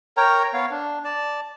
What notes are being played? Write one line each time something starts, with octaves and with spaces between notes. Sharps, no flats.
A#4 C#5 G5 A#5
B3 C#5 F5
D4
D5 A5